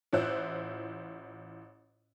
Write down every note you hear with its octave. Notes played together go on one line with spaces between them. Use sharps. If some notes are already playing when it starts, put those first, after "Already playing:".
A1 E4 F4 C5 F#6